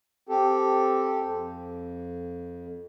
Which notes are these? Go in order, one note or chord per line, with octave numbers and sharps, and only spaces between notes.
C4 G4 A4
F2